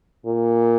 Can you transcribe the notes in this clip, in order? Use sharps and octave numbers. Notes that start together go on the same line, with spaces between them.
A#2